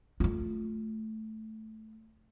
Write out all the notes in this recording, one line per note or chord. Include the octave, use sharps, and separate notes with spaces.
A3 F4